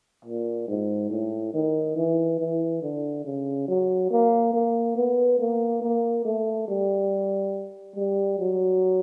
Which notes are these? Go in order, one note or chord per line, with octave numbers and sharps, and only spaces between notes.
A#2
G#2
A2
D#3
E3
E3
D3
C#3
F#3
A#3
A#3
B3
A#3
A#3
A3
G3
G3
F#3